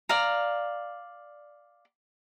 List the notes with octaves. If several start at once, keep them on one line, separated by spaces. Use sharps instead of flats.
D5 F5 A#5